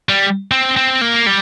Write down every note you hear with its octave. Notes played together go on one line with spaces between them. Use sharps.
G3
C4
C4
A#3
G3